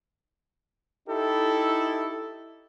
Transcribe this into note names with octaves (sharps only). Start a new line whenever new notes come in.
D#4 E4 G4 A4